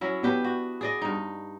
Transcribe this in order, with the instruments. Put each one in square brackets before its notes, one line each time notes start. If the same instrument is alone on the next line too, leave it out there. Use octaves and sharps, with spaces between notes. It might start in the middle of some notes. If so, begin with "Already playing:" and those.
[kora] F#3 C#4 E4
[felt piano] B3 [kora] D4 G4 B4
[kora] F#4
G#4 D5 D#5
G2 D#4